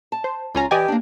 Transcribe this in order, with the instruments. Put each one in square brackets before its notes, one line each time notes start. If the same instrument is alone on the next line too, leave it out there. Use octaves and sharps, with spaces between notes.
[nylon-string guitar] A5
[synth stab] C5
[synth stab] C#2 C#4 A#5 [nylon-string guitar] F4 G#5
[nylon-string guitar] E3 [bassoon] G4 [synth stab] D5 D#5 G#5
[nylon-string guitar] A#3 D4